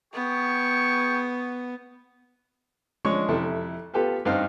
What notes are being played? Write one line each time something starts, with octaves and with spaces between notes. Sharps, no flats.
B3 G#4 G5 C#6
F3 G#3 D4 C#5 C#6
F2 C3 E4 A4
B3 F4 G4 A4 B4
G2 C4 D#4 F5